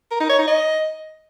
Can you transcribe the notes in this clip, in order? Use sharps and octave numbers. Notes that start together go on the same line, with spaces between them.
A#4
D#4
C#5
D#4
D#5